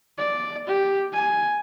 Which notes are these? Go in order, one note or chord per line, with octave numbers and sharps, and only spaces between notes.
D5
G4
G#5